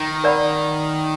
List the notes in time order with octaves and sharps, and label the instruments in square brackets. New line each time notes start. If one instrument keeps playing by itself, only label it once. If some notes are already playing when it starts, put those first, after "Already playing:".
Already playing: [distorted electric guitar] D#3
[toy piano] A#4 D5 F#5 B5